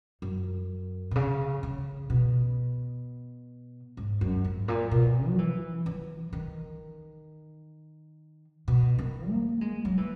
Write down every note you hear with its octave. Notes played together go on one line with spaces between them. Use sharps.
F#2
B2
C#3
C#3
B2
G#2
F#2
G#2
A#2
B2
F#3
E3
E3
D#3
B2
D#3
A#3
G#3
F#3
E3